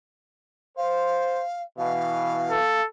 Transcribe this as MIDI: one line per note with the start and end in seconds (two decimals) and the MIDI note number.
0.77 1.41 72
0.77 1.62 77
1.78 2.56 47
1.78 2.56 52
1.78 2.80 77
2.51 2.86 69